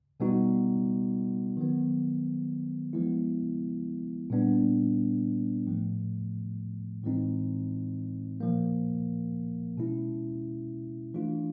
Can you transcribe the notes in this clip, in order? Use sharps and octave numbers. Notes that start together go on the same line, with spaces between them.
B2 G3 B3 D#4 F#4
D#3 F#3 B3
F3 G#3 B3 E4
A#2 G3 B3 D4
A2 F3 A3
A2 E3 G#3 C4 D#4
A#2 F3 A#3
B2 G#3 C#4 E4
E3 A3 D4 F4